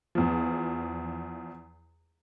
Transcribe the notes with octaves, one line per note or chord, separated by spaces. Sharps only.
E2 F3